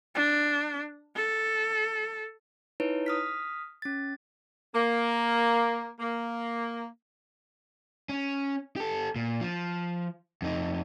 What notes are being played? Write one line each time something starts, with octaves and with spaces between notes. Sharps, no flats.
D4
A4
D#4 E4 B4 C#5
D#6 F6 B6
C#4 A6
A#3
A#3
C#4
G4 A4
A#2
F3
F2 D#4